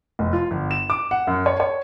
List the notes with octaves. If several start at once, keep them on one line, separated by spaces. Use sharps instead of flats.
F1
F4
G1
E7
D6
F#5
F#2
C#5
C#5